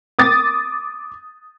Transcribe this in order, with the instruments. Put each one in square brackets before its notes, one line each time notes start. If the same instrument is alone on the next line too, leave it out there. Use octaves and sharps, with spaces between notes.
[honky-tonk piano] D6 D#6 A6